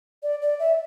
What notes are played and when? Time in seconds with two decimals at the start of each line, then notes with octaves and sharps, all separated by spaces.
0.23 D5
0.42 D5
0.59 E5